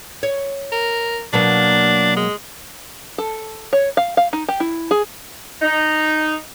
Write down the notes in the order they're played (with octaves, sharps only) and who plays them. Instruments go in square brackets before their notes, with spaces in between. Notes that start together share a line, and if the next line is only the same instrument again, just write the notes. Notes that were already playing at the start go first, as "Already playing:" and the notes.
[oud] C#5
[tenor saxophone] A#4
[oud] B2 F#3 A#3 [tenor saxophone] D4
[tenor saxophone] G#3
[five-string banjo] A4
C#5
F5
F5
D#4
G4
E4
G#4
[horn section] D#4